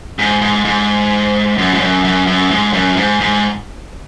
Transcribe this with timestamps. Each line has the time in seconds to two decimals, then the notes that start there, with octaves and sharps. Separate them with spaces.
0.19 G#2
0.41 G#2
0.65 G#2
1.58 F#2
1.74 G#2
1.81 F#2
2.04 F#2
2.27 F#2
2.51 G#2
2.73 F#2
2.97 G#2
3.21 G#2